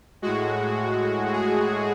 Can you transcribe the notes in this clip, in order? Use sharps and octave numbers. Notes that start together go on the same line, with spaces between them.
A2 G#3 F#4
G#4